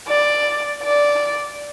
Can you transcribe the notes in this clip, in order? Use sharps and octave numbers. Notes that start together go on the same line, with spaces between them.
D5
D5